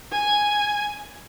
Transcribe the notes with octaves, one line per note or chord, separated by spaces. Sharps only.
G#5